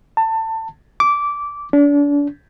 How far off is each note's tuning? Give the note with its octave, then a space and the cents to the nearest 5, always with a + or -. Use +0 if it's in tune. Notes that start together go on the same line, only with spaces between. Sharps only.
A5 +25
D6 -15
D4 -35